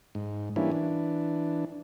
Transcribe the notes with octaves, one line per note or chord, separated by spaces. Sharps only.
G#2
E3 G3 A#3 C#4 D4 E4
E3 D4